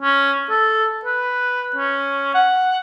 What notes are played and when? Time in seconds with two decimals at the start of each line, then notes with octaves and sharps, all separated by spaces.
0.02 C#4
0.50 A4
1.05 B4
1.76 C#4
2.34 F#5